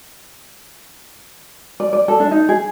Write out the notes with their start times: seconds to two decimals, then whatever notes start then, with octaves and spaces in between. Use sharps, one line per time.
1.80 D5
1.93 D5
2.08 A4
2.20 D4
2.31 D#4
2.49 G#4